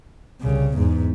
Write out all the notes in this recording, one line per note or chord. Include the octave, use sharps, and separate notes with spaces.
C2 C#3
E2 G#2